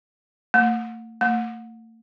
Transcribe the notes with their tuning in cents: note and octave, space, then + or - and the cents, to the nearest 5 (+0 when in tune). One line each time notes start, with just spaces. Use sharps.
A3 +45
A3 +45